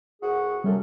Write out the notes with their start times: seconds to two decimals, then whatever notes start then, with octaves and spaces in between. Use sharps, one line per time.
0.22 C2 F#4 G#4
0.64 F#2 C3 G3 A4